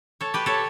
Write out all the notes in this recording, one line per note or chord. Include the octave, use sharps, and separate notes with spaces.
A4 C#5
G4 B4
A4 C#5